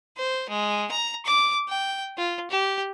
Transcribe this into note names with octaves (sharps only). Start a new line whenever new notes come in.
C5
G#3
A#5
D6
G5
F4
G4